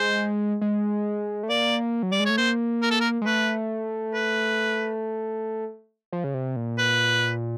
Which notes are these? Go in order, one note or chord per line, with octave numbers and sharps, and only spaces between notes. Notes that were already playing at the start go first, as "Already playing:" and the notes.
Already playing: G#3 C5
G#3
A3
A#3 D5
F#3
G3 D5
G#3
A3 C#5
A#3 C5
A#4
A4
A#4
G#3
A3 B4
B4
F3
C#3
C3
A#2
B4